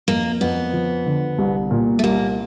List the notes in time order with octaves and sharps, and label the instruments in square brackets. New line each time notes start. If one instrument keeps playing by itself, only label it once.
[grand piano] F2 [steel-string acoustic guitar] A#3
[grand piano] F2 [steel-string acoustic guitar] B3
[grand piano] F3
D3
C2
A#2
[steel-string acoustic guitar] A3
[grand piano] C2 [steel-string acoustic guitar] A#3